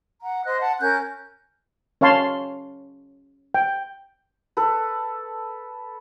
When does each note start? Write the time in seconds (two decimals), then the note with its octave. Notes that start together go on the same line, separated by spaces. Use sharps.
0.22 F#5 A#5
0.45 C5 D#5 F#6
0.61 F#5 A5
0.80 C#4 A#4 F#6 G6
2.01 C#4 C#5 F5 A5 C6
3.54 G5
4.57 A4 B4